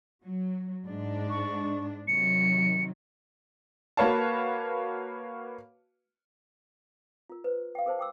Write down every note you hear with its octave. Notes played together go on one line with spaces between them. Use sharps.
F#3
G#2 D4
C#6
C3 D#3 F#3 C#7
A#3 F#4 B4 C#5 F5 A5
F4 A#4
B4 C5
F5 G5
G#4 A#4 C5 A5
G5 D6 E6